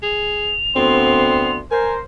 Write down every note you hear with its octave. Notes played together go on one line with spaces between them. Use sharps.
G#4 F7
D2 B3 C4 C6
A#4 C5 G#5